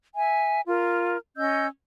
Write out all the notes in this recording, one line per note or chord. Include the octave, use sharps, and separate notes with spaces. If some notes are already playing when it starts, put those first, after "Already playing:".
E5 G#5
F4 A#4
C#4 D#5 E6 G6